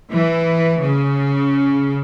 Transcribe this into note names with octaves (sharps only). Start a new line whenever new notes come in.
E3
C#3